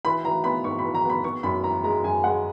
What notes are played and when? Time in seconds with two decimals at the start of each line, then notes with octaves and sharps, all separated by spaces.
0.05 E3 B5
0.24 E3 A#5
0.44 B3 B5
0.64 G#2 C#6
0.79 B5
0.84 E3
0.94 A#5
1.05 B3 B5
1.24 B3 C#6
1.43 F#2 B5
1.64 E3 A#5
1.84 G#3 A#5
2.04 F#2 G#5
2.24 G#3 F#5